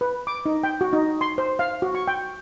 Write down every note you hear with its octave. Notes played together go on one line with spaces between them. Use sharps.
B4
D6
D#4
G5
F#4
D#4
C6
C5
F5
F#4
C#6
G5